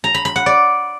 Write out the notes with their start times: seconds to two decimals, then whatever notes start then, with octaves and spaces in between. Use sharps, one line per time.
0.04 A#5
0.14 B5
0.25 B5
0.36 F#5
0.46 D5